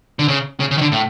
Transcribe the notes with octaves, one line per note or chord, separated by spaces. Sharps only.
D3
C#3
C#3
C#3
D#3
D3
A2